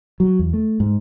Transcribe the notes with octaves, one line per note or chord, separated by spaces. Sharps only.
F#3
E2
A3
G#2